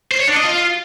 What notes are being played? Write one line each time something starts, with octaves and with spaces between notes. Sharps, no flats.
C5
C#5
D4
D#5
F4